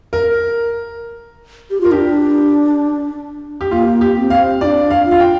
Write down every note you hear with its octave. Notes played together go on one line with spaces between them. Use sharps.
A#4
G4
F4 A#4
D4 G4
G4
A#3 F4
G4
C4
F5
D4 F4 D5
F5
F4
F5
G5